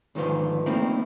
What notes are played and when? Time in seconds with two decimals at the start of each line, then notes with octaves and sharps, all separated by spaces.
0.15 D2 G#2 D#3 F3 B4 C5
0.66 A3 A#3 C4 D#4 E4